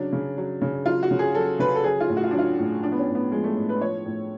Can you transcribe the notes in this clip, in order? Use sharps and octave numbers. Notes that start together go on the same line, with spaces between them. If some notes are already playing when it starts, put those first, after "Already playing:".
Already playing: C#3 F#3 D4
C#3
F#3
C#3
F#3 F4
F#4
C#3
G#4
F#3 A4
C#3 B4
A4
F#3 G#4
F4
A2
F#4
F4
D4
F#3 F4
A2
F3 D4
B3
C#4
A2
B3
F3 G#3
A3
A2
B4
F3 C#5
A2